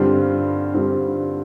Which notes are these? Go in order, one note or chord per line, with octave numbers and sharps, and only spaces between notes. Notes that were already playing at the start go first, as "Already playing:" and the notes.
Already playing: G2 D3 G3 C4 F4
G2 D3 G3 C4 F4